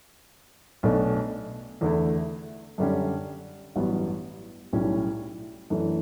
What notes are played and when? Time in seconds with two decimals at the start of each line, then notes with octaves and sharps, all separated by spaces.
0.83 B1 B2 A3 D4
1.81 E2 D3 A3 E4
2.78 F#2 D3 G3 C#4
3.76 A1 G2 F#3 B3
4.73 B1 A2 G3 C#4 E4
5.70 F#2 E3 A3 D4